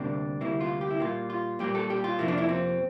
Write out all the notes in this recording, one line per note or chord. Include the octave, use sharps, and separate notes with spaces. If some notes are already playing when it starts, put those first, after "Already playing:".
Already playing: D2 C3 G3 A#3 D4
D2 C3 G3 A#3 E4
F4
G4
E4
A#2 G3 A#3 F4
F4
A#2 G3 A#3 G4
A4
G4
F4
F2 C3 F3 A#3 E4
D4
E4
C4